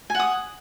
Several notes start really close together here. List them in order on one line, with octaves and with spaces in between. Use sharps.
G#5 F#5 D#6